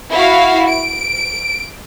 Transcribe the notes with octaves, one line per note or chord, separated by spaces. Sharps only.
E4 F#4 F5
D7